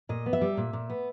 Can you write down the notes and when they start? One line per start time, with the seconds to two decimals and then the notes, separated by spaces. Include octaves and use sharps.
0.09 A#2 D#5
0.26 B3
0.33 E5
0.41 G3
0.57 A#2
0.73 A#2
0.90 B3